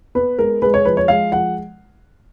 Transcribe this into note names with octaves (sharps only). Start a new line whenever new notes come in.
B3 B4
G#3 A#4
G#3 B4
C#5
F3 B4
C#5
G#3 F5
F3 F#5